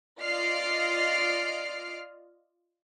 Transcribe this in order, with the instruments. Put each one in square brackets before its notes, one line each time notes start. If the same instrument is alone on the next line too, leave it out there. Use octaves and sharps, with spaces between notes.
[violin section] F4 D5 D#5 F6 C7 D7